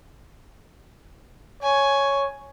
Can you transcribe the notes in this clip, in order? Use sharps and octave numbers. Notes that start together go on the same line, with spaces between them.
C#5 G#5